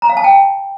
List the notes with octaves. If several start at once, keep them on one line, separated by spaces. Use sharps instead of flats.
A#5
F5
A5
G5